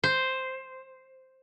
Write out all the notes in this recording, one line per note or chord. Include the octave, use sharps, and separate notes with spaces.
C5